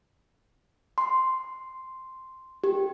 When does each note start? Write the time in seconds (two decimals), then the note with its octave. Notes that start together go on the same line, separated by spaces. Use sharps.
0.98 C6
2.64 G4